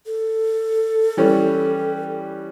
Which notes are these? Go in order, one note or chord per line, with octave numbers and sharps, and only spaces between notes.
A4
E3 G3 C#4